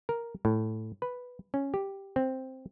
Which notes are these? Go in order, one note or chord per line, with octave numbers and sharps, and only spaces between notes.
A#4
A2
B4
C#4
G4
C4